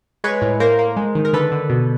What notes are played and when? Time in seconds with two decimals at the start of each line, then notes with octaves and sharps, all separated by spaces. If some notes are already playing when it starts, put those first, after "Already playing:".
0.24 G#3 B4 C#5
0.42 A2
0.60 A#3 A#4 C5
0.79 A#3
0.96 G#3
1.15 D#3
1.25 A#4
1.33 D3 A4 B4
1.52 D3
1.70 B2